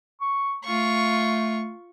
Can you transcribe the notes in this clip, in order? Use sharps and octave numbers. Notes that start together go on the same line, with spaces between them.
C#6
A3 F4 C#6